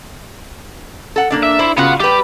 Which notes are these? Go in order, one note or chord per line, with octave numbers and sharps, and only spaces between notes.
A4 F#5
A#3 D4 D5
E5
E4 C5 D5
C#3 B3 F4 F#4 F#5
G3 G4 B4